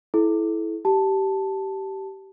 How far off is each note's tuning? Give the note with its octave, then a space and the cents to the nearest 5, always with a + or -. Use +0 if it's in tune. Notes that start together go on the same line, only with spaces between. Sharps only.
E4 -5 A4 -35
G4 -20 A5 +0